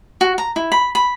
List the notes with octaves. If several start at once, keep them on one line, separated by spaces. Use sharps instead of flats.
F#4
A#5
E4
B5
B5